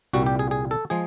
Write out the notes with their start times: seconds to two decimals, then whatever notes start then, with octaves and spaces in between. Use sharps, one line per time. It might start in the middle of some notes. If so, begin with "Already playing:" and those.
0.13 C2 A#2 G3 F#4
0.26 G4
0.39 G#4
0.51 G#4
0.71 A4
0.90 F3 G#3 G#4